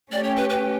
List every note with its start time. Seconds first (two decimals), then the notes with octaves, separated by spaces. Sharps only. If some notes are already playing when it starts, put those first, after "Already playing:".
0.11 A3 C#4 G4 D5
0.24 C#5
0.36 B4
0.50 B4